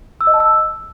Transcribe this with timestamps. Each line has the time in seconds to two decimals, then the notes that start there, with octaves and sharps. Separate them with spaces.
0.21 E6
0.27 D#5
0.34 A5
0.40 E6